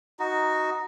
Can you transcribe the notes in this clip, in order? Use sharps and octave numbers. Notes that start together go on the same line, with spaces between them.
D#4 F#4